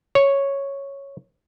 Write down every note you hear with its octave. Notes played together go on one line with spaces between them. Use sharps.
C#5